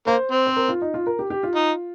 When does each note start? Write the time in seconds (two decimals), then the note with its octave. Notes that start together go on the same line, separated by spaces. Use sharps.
0.07 A#3 C5
0.32 C4
0.47 C5
0.56 A#4
0.68 F4
0.82 D#4
0.94 F4
1.07 A#4
1.19 G4
1.30 G4
1.43 F4
1.55 D#4